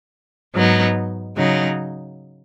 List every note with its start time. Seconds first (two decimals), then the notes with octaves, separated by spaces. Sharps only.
0.54 G#2 F#3 B3 D#4
1.36 C#3 F#3 D#4